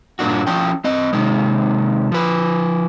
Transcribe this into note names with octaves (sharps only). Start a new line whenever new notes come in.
G2 A#2 A#3 D4 F#4
F3 C#4 G5
C4 D#5
C3 D#3 G#3
F3 B4